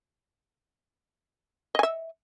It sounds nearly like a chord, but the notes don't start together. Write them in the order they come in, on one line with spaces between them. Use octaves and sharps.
D#5 G#5 E5